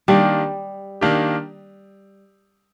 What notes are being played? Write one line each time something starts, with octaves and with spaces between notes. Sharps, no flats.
D#3 G3 A#3 D4 G4
D#3 A#3 D4 G4